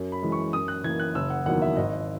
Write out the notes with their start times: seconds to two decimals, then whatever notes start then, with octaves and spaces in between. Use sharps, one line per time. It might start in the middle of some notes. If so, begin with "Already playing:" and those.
Already playing: F#2
0.12 B5
0.22 E3 G#3
0.32 C#6
0.53 F#2 D#6
0.68 F#6
0.84 E3 G#6
0.89 A#3
1.00 F#6
1.15 F#1 E6
1.30 F#5
1.46 E2 D#3 F#3 A#3 F#5
1.62 E5
1.77 G#1 D#5